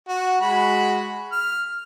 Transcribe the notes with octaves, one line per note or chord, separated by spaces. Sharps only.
F#4
G#3 F#4 B5
F6